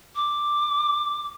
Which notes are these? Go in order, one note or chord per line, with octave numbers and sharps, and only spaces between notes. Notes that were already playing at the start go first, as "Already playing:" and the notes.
D6